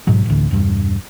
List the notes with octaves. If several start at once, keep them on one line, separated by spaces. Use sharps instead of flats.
A#1 G#2 B2 F#3
A1 D2
E1 G2